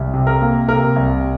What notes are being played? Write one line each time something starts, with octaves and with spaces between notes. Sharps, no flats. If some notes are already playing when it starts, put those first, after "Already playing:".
Already playing: C2
C3
A#4
A#3
C3 A#4
C2